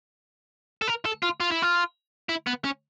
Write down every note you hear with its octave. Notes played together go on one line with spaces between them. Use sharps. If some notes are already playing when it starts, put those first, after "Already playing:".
A4
A#4
A4
F4
F4
E4
F4
E4
B3
C#4